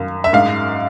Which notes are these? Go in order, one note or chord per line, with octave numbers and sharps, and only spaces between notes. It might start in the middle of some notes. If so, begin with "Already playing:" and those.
Already playing: F#2 D#3 F5
E5
G#2 F5